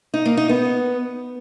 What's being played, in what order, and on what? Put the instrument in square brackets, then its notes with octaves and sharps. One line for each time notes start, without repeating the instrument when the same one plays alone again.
[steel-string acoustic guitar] D#4
A#3
D#4
B3